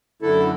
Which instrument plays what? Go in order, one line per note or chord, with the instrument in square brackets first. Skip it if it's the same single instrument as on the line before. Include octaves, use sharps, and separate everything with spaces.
[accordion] F#2 D3 A3 E4 A4